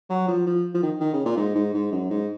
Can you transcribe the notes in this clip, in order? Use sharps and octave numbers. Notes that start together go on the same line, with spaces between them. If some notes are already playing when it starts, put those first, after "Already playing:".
F#3
F3
F3
F3
D#3
D#3
C#3
A#2
G#2
G#2
G#2
F#2
G#2